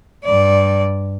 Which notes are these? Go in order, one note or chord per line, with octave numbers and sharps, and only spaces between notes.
G2 D5